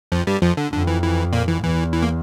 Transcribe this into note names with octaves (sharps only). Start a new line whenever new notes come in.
F2 F3
G2 G3
F2 F3
D3
F2 D3
E3
E3
A#2 A#3
E3
E2 E3
E3
A#3